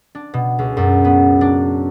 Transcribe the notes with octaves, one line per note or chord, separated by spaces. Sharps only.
D4
B2
C#2
F#2
B3
D4